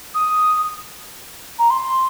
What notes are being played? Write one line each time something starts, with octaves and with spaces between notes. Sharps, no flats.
D#6
A#5
C6